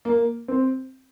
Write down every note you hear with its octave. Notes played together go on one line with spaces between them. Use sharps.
A#3
C4